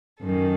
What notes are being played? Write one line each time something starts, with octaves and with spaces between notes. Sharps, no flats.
F#2 D#3 A4